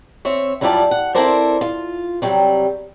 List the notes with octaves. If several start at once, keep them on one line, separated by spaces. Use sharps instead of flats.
C4 C#5 E5
F#2 G3 E4 F4 D5 A5
F#5
C4 E4 A4 A#4 C5 D5
F4
C3 F#3 G3